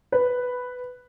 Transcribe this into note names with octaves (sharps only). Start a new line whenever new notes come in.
B4